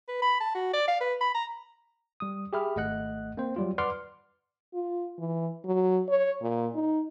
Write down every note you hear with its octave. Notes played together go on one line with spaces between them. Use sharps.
B4
B5
A5
F#4
D5
F5
B4
B5
A#5
G3 D#6
G4 G#4 E5 B5 F6
G#1 A3 D#5 F#5 F#6
A#3 C4 C5
F#3 G3 F4
B4 D5 F#5 C6 D6 F6
F4
E3
F#3
C#5
A#2
D#4